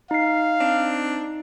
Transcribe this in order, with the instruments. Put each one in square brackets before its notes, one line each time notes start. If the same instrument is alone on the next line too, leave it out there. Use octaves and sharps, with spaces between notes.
[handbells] D#4 C7 [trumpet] F5
[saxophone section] C4 D4